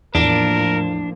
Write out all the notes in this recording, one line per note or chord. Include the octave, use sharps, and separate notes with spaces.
E2 A2 F3 A#3 D4 A#4